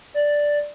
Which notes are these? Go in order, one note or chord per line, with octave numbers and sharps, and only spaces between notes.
D5